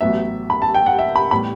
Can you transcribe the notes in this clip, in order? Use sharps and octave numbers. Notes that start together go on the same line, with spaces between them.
A1 A2 F#3 B3 E5
B5
A5
G5
F#5
E5
B5
A2 G3 B3 B5